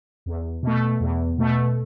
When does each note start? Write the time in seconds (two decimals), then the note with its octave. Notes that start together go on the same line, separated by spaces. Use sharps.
0.26 E2
0.63 B2 A3
1.01 E2
1.38 B2 A3